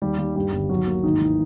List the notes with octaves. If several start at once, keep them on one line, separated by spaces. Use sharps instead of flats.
D#2 G3 G4
D#2
G2 G3 G4
G1
D#2 F#3 F#4
A#3
G#1 D#3 D#4
E3